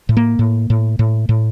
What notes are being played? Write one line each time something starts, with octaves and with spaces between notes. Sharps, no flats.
A2
A#3
A2
A2
A2
A2